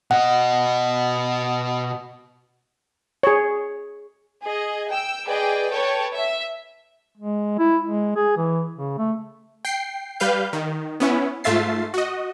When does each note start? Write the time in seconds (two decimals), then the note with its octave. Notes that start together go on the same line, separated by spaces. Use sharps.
0.11 B2 D#5 F#5
3.23 G#4 C#5
4.40 G#4 D#5
4.90 G5 E6
5.26 G#4 B4 D5 D#5 G5
5.72 A4 B4 C#5 G5 A5
6.14 E5
7.17 G#3
7.58 E4
7.86 G#3
8.16 G#4
8.37 E3
8.77 C#3
8.98 A3
9.65 G5 C7
10.20 G3 B4 F5 G6
10.53 D#3
11.00 B3 C#4 E4
11.44 G#2 A3 F4 E5 A6 C7
11.94 F#4 D#5